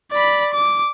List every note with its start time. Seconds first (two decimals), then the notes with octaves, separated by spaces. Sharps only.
0.12 D5 B5
0.54 D6